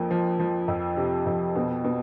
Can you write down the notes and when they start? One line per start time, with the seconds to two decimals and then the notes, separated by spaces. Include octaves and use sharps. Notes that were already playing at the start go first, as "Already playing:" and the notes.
Already playing: F2 F3 A#3
0.11 F3
0.40 F3
0.68 F2
0.97 C3
1.26 F2
1.56 B2
1.84 B2